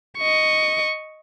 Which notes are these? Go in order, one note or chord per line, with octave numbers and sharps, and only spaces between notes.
D#5 C#6